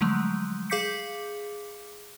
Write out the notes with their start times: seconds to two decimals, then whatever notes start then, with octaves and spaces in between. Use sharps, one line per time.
0.01 D3 F3 F#3 G#3 A3
0.70 G#4 F5 D6 G6 B6 C#7